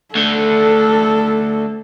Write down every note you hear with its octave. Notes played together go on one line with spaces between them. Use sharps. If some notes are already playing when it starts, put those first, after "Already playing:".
D2 D3 A4